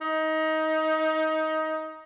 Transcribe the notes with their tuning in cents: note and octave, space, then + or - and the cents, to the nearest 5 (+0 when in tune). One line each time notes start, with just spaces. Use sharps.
D#4 +20